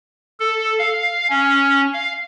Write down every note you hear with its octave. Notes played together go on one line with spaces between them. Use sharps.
A4
F5
C#4
F5